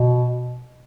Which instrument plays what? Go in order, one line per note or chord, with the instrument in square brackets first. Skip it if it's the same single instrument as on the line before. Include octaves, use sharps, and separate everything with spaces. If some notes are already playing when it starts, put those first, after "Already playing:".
Already playing: [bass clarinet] B2